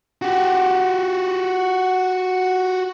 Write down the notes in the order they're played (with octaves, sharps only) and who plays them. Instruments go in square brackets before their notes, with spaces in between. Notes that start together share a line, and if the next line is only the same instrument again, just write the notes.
[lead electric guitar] F#4 G4